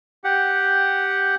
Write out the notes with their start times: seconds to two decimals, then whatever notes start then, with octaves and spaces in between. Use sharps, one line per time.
0.24 G4 F#5